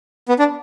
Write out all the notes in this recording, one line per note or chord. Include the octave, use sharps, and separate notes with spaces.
B3
D4